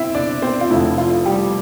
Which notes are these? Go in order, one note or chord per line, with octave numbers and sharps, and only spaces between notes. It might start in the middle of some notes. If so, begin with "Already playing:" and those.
Already playing: C4 E4 E5
D4 D5
C4 C5
F4
F1 F2 D3 E4
F4
G3 G4